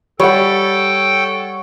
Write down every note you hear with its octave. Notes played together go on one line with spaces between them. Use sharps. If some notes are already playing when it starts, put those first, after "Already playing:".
G3 A4 C#5 F#5 G5